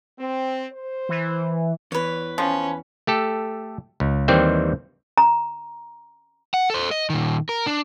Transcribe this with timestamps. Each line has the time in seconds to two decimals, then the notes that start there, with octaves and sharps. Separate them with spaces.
0.19 C4
0.73 C5
1.09 E3
1.92 E2 E3 B4 C#5
2.38 F3 C#4
3.07 A3 G4 A4
4.00 C#2
4.28 D#2 D#3 E3 G3 C4 C5
5.18 A#5
6.54 F#5
6.70 A4 C5
6.91 D#5
7.10 A#2 D#3
7.49 A#4
7.67 D4